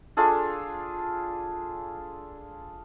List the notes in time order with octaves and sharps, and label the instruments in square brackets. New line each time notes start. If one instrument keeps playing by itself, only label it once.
[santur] D4 F4 G#4 A4